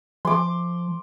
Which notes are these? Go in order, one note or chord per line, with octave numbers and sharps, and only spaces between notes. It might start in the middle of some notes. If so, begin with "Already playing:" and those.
F3 C6 D6